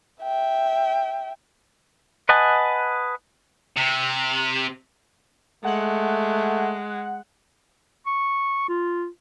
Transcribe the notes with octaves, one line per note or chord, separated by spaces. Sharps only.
E5 G5
B4 D#5 F#5 G#5 A5
C3
G#3 A3 F#5
C#6
F4